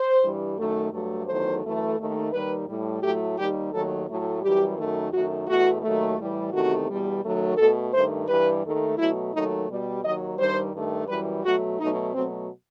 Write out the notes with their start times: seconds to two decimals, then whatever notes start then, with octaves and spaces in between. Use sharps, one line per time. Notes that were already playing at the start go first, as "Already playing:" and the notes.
Already playing: C5
0.21 G2 E3 G3
0.57 F#2 D#3 A3
0.92 G2 F#3 A3
1.27 E2 D#3 F#3 A3 C5
1.63 F#2 E3 A3
1.97 D#2 D#3 A3
2.32 D#2 D#3 G3 B4
2.67 A2 G3
3.02 A2 F#3 A3 G4
3.37 D#2 D#3 G3 G4
3.72 D#2 D#3 F#3 A3 A4
4.08 A2 F#3 A3
4.42 F#2 E3 G3 G4
4.77 F#2 D#3 A3
5.12 F#2 D#3 A3 F#4
5.48 E2 B2 A3 F#4
5.82 D#2 D#3 F#3 A3
6.18 A2 E3 G3
6.53 E2 C3 D#3 A3 F#4
6.88 E2 B2 G3
7.22 F#2 D#3 F#3 A3
7.57 B2 A3 A4
7.92 G2 D#3 A3 C5
8.28 G2 E3 G3 B4
8.64 D#2 D#3 A3
8.98 B2 F#3 A3 E4
9.33 D#2 D#3 F#3 A3 D#4
9.68 B2 G3
10.03 D#2 D#3 F#3 D#5
10.38 G2 D#3 G3 C5
10.73 G2 D#3 A3
11.08 F#2 E3 G3 B4
11.43 B2 F#3 A3 F#4
11.79 B2 F#3 A3 D#4
12.13 B2 F#3 A3 C4